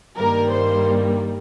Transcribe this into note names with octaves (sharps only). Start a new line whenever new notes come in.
G2 D#3 G3 A#3 A#4
C5